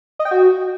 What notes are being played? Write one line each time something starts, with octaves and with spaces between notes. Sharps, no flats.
D#5
G5
F#4